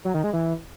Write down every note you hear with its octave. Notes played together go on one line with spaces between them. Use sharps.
F#3
D#3
G#3
E3